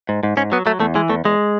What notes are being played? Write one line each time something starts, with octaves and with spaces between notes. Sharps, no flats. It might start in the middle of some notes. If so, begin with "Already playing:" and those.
G#2
G#2
G#2 C#4
F#3 B3
F#3 A3
E2 A3
E3 G#3
E2 A3
E2 G#3